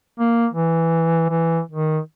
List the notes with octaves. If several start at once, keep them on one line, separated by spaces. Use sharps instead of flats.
A#3
E3
E3
D#3